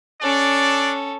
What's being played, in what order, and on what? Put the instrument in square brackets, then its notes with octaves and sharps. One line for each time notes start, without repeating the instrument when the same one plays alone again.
[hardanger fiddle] C#4 A4 [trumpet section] D4 D5